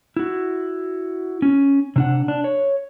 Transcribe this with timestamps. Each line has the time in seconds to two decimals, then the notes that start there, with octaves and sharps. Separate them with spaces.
0.17 E4 F#4
1.42 C#4
1.96 C3 D4 F#5
2.28 D4
2.44 C#5